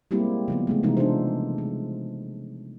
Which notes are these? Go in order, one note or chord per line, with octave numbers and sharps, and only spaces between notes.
G3 G#3 A#3 C4 E4 G4
C#3 F3 B3
C#3 G#3 A3
C3 E3 F3 G#3 D#4
D4 D#4 F4 A4 C5
G#3